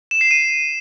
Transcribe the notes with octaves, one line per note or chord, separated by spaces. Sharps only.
E7
C7
D#7